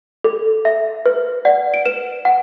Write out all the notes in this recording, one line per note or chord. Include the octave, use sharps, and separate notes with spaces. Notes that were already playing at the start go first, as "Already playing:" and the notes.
A4
E5
B4
D5 F#5
D7
B4 E7
F#5